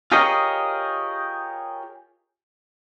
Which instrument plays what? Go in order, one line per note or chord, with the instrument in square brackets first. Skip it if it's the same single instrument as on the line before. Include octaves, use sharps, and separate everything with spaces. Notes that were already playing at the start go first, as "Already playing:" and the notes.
[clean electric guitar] F4 G4 G#4 A#4 C#5 D#5